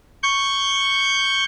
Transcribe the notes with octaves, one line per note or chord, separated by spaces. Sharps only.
C#6 G6